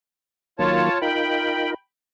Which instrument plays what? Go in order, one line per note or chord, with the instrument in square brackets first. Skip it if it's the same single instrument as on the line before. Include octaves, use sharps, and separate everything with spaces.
[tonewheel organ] D#3 F#3 A#3 [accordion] F4 C#5 A5
[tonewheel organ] D#4 F4 A#4 [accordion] G5 B5